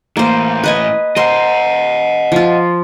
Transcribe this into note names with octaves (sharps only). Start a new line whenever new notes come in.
A2 E3 A#3 C5
B4 D#5 G#5
A#4 C5 D#5 F#5 C6
F3 F4